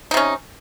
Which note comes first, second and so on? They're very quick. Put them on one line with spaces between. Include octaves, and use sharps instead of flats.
D#4 C3 C#4